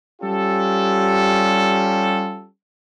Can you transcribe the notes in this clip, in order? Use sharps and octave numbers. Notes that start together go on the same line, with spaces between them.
G3 C#4 F4 G4 A4